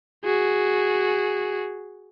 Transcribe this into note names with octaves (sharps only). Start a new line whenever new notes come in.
F#4 G#4